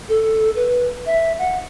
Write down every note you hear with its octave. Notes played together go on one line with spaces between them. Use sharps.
A4
B4
E5
F#5